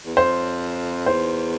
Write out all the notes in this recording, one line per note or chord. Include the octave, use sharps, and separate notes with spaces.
E2
F2 C5
E2 C5